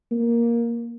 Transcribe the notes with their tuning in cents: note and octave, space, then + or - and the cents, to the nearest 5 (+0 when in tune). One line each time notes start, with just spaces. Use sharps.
A#3 +10